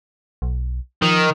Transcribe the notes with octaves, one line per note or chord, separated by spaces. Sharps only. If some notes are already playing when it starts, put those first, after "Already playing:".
B1
D#3 F3